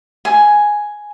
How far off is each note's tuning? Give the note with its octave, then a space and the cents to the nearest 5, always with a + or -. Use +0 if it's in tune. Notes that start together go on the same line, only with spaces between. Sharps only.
G#5 +0